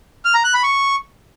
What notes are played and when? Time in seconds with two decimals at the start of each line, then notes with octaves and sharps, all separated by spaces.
0.25 F6
0.35 A#5
0.44 F#6
0.54 B5
0.64 C#6